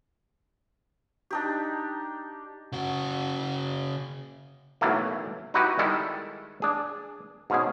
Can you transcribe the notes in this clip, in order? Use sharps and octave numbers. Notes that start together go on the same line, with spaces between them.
D4 D#4 G4
C#3 F#4
B1 A2 E3 F#3 A3 A#3
D#4 E4 F#4 G4 B4
D#3 G3 G#3 E4 A4
D4 G#4
G#2 B2 C#4 G#4